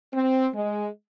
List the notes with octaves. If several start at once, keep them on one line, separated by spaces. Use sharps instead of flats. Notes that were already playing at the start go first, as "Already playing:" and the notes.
C4
G#3